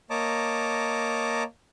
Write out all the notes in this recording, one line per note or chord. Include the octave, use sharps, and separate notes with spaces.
A#3 C#5 D#5 A5 A#5 D6